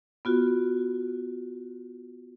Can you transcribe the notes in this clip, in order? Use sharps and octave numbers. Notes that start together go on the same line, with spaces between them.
B3 F4 F#4